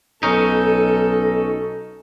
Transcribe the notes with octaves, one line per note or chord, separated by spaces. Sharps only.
B1 C#4 D#4 A4